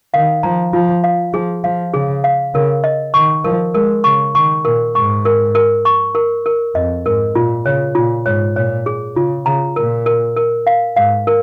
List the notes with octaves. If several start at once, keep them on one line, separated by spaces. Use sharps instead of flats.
D#3 F5
F3 A#5
F3 F4
F5
F3 G#4
F3 F5
C#3 G#4
F5
C#3 A#4
D#5
D#3 C#6
F3 A#4
G#3 A#4
C#3 C#6
D#3 C#6
A#2 A#4
G#2 C#6
A#4
A#4
C#6
A#4
A#4
F2 D#5
G#2 A#4
A#2 F4
C#3 C#5
A#2 F4
G#2 C#5
A#2 C#5
G#4
C#3 F4
C#3 A#5
A#2 A#4
A#4
A#4
F5
G#2 F5
A#4